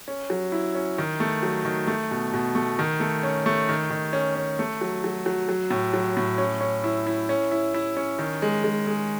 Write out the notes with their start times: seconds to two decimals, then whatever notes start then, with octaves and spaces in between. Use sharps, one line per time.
0.08 C#4
0.30 F#3
0.52 E4
0.75 C#4
0.98 D#3
1.20 A3
1.43 F#3
1.65 D#3
1.87 A3
2.11 B2
2.33 B2
2.55 A3
2.79 D#3
3.00 A3
3.23 C#4
3.46 A3
3.69 D#3
3.90 D#3
4.13 C#4
4.36 C#4
4.59 A3
4.81 F#3
5.04 F#3
5.26 F#3
5.49 F#3
5.71 A2
5.94 F#3
6.17 A2
6.38 C#4
6.61 C#4
6.84 E4
7.07 E4
7.29 C#4
7.51 E4
7.74 E4
7.97 C#4
8.19 D#3
8.42 G#3
8.64 G#3
8.87 G#3